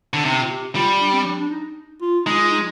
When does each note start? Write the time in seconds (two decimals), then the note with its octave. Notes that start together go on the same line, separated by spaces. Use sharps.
0.14 D3
0.25 C3 D#4
0.42 F4
0.50 G4
0.75 G3 F4
1.01 D4
1.13 C4
1.26 D4
1.40 D4
1.51 D#4
2.01 F4
2.26 G#3 D#4
2.39 F4
2.51 D#4